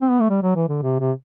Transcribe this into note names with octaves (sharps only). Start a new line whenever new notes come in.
C4
B3
A3
G3
F#3
E3
D3
C3
C3